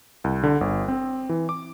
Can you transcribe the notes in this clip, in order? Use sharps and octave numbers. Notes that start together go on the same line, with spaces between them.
C2
D3
G1
C4
E3
D6